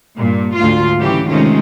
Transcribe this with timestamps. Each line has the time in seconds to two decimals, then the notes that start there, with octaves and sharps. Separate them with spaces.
0.16 G2 A#2
0.55 D2 G#2 F4
0.98 C#3 E3 F#3 C#4 G4
1.29 C3 D#3 G#3 A3 C#4 F4